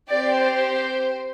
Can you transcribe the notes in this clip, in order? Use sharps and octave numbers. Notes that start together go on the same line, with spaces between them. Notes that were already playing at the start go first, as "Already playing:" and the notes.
C4 G4 D5
C5